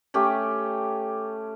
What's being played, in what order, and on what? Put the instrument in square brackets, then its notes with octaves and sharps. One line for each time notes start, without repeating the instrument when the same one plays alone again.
[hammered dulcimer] A3 C#4 G4